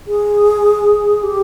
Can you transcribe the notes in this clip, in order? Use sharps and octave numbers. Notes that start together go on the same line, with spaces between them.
G#4
G4